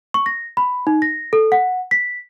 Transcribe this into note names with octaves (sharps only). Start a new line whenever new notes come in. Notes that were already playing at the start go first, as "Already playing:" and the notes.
C#6
A#6
B5
D#4
A#6
A4
F#5
B6